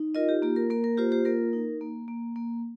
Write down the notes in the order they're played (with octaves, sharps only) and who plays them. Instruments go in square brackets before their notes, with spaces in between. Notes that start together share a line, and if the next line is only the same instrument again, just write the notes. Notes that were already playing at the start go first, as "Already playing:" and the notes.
Already playing: [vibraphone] D#4
F4 A#4 D#5
G4
A#3 G4
A#4
A#3 A#4
A#4
F4 G4 C5
G4 C5
A#3 A#4
D#4
A#3
A#3
A#3